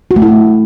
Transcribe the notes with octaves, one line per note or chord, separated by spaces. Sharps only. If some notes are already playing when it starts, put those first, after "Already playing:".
F#4
A3
E4